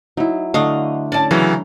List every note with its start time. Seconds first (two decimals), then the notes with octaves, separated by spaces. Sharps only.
0.17 F#3 D#4 E4
0.54 D3 A3 D4 D#5 F5 C#6 D#6
1.12 C#4 E4 D5 A5
1.31 C#3 E3 F#3 A#5